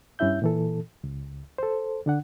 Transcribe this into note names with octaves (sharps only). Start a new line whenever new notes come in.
G2 C#4 E4 E5 G6
A#2 E3 A4
C#2
A4 C5
D3 D4 F#5